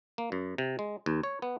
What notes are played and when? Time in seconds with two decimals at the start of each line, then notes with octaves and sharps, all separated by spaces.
0.18 A#3
0.32 F#2
0.58 C3
0.79 G#3
1.06 D#2
1.23 C#5
1.42 B3